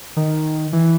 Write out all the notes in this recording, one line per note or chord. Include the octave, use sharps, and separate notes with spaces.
D#3
E3